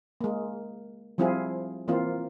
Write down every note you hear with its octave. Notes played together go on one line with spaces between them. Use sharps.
G#3 A#3
F3 G3 C4 E4 F4 G#4
E3 A#3 C4 F4